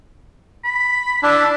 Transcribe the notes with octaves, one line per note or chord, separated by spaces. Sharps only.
B5
D4 E4